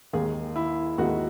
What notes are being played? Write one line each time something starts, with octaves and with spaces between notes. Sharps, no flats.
D#2 D#3 G#3 G#4
E4
D#2 D#3 G#3 F#4